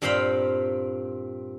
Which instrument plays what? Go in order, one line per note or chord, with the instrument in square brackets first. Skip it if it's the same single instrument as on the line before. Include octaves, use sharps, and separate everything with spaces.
[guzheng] G2 A#2 C4 F5 G5 B5